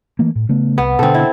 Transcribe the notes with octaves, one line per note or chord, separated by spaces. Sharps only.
E3 A3 A#3
A2
C#3 A3 B3
C2 B3
B2 D3 C4 A4
E4